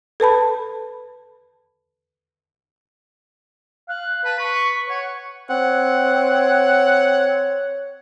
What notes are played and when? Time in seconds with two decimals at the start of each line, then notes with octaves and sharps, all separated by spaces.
0.20 A4 B4 A5 B5
3.89 F5 F#6
4.25 B4 A5
4.39 B4 C#6
4.89 C#5 F#5
5.50 C4 C#5 F#5